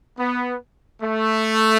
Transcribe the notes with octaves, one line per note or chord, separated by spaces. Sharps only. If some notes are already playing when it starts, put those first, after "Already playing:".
B3
A3